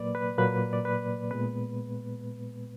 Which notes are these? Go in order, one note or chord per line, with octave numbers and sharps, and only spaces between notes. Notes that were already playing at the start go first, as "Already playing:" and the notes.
Already playing: A#2 F#3 A#3 B4 D5
B4
A#2 F#3 A#3 B4
D5
B4
A#2 G#3 B3 B4